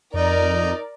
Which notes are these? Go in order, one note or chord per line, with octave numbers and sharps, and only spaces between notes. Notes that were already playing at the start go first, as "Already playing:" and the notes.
F2 D#4 A#4 D5